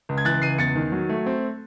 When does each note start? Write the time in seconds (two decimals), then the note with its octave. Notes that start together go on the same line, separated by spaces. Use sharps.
0.09 C#2
0.18 G#6
0.25 E3 F#6 A6
0.42 C#2 C7 D#7
0.58 E2 A6 C#7
0.76 D#3
0.92 F#3
1.09 A3
1.26 C4